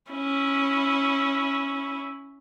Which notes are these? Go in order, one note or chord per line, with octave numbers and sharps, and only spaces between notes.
C#4 E4